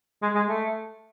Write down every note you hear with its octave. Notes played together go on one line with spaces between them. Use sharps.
G#3
G#3
A3